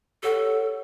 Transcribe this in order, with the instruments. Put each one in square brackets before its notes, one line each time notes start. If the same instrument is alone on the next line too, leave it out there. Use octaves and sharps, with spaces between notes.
[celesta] G4 C#5 F#5 [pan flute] A4